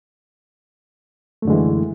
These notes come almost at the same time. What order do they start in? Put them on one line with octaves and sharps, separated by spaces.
A3 F#2 D3 G#3 E3